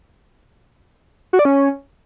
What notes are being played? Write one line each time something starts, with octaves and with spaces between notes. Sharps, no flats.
F#4
D5
C#4